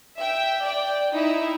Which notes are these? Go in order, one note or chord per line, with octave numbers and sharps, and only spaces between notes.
E5 G5
D5 G5
D#4 E4 E5